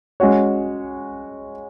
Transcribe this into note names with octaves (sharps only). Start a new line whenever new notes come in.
G#3 C#4 F#4 C#5